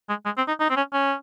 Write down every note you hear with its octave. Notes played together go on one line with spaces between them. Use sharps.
G#3
G#3
C4
D#4
D#4
C4
C#4
C#4